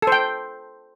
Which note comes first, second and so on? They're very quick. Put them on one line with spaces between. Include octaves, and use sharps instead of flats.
A4 C5 G5